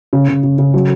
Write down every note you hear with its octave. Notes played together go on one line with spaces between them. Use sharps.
C#3
C#3
C#3
C#3
F#3